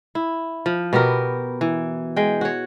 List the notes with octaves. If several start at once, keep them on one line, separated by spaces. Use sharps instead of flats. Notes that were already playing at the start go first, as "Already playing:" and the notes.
E4
F3
B2 B3 G4 A#4
E3
G#3 G5
F#4 C#5